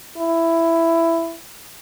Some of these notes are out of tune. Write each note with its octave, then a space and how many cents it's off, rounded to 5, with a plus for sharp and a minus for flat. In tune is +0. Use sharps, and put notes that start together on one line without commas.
E4 +10